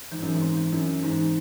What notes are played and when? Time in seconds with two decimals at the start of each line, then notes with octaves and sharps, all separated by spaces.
0.12 G#2 E3
0.22 F#2 E3
0.34 G#2
0.42 C4
0.57 E3
0.72 F#2 E4
0.88 E3
1.02 G#2 E3
1.18 C4